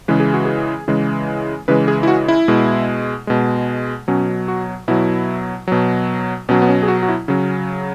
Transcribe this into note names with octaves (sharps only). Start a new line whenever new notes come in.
C#3 E3 G#3 B4
G#4
F#4
G#4
C#3 E3 G#3
C#3 E3 G#3 B4
G#4
E4
F#4
E4
B2 G#3
B2 G#3
B2 F#3 C#4
F#4
B2 F#3 E4
B2 F#3
B2 F#3 C#4
B3
C#4
G#4
F#4
F#4
E4
C#3 F#3 C#4